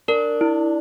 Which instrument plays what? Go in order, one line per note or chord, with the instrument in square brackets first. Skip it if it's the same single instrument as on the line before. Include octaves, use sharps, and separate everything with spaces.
[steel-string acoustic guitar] D4 [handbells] A#4
[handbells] E4